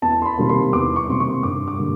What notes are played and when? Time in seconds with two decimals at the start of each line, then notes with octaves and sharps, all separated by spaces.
0.02 E2 A5
0.22 C6
0.25 B5
0.38 C3 D#3 G3 A#3
0.49 C6
0.73 E2 D6
0.96 C#6
1.08 C3 D#3 G3 A#3 C6
1.20 C#6
1.43 G2 D6
1.68 D6
1.78 D3 G3 A#3